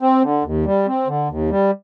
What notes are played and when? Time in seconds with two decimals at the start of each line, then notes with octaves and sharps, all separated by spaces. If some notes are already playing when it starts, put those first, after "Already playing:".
0.01 C4
0.22 D3
0.44 D#2
0.65 G3
0.87 C4
1.07 D3
1.29 D#2
1.50 G3